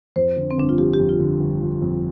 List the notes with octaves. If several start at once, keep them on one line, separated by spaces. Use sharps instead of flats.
F2 C5
D3
C4
G1 D4
F4
F3 G4
G4
F2
F4
D3
G1
F3
F2